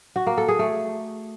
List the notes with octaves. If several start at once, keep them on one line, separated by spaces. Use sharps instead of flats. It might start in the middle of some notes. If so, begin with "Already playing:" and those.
F#4
A#3
A4
G#4
A3